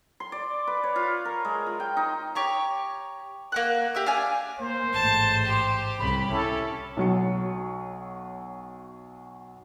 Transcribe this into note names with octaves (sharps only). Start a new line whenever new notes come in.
C6
D5
B4
C#5
F4
A#4
G#3
F4
G5
D#4
G4 C#5 A#5
A#3 F#5 F#6
G4 E5 E6
D4 F5 G#5
A#3 C5
A1 G#2 A5
G4
C2 C#3 B5
C#4 E4 A4
B1 F#3 C#7